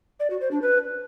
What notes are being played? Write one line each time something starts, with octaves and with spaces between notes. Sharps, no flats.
D5
F#4
C5
D4
B4